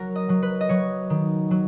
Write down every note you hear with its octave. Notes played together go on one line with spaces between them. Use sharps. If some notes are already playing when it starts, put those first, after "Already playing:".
Already playing: F#3 F#4 A#4
D#5
F#3
B4
D#5
F#3 C#5
D#3
F#3